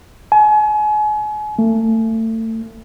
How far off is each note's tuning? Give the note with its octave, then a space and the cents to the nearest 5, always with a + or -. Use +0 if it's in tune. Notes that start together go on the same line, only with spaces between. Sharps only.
G#5 +35
A3 +30